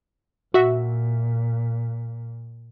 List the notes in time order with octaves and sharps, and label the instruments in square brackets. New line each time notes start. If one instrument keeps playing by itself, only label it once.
[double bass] A#2 [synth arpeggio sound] F#4 E5